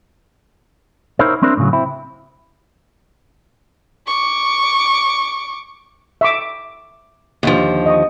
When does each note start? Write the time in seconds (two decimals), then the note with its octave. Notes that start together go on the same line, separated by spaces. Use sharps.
1.19 D#4 E4 A#4 C5 C#5
1.43 C4 D4 E4 A#4 C5
1.57 A2 C#3 F#3
1.73 C4 E4
4.07 C#6 D6
6.21 E5 C#6 D6
7.43 D#2 D3 F3
7.86 D#5 C#6